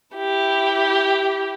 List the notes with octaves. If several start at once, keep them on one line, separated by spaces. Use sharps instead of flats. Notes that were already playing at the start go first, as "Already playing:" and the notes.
E4 G4